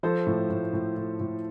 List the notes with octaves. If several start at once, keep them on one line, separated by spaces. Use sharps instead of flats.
F3 A4 C5
A2
A2
A2
A2
A2